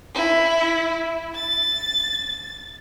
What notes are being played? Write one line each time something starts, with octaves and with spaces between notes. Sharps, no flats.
E4
A6